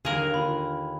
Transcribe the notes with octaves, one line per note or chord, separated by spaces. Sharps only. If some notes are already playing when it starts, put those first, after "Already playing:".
D#2 D3 G#4 A#4 F5
D3 F4 B5